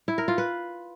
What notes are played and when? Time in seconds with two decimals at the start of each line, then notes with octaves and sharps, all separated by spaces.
0.08 E4
0.18 A#4
0.28 F4
0.38 B4